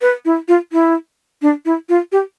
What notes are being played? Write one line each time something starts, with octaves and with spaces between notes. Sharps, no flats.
B4
E4
F4
E4
D4
E4
F4
G4